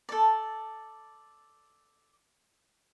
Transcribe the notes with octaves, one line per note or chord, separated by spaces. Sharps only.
A4 D5